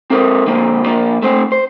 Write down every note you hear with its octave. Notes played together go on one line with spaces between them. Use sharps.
C4 A4 A#4 C5
D3 F3 A#3 C5
A#2 F3 A#3 D4
A3 C4 C5
C5